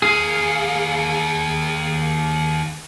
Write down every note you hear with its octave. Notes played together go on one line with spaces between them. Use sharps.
D#2 G#4 F5